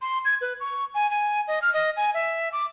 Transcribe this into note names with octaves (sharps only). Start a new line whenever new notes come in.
C6
G#6
B4
C#6
G#5
G#5
D#5
F6
D#5
G#5
E5
D6